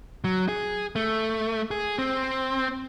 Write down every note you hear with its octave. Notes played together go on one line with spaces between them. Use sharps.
F#3
G#4
A3
G#4
C4